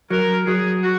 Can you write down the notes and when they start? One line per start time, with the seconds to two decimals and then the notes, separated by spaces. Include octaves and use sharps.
0.10 F#3 A#4
0.47 F#3 G#4
0.83 F#4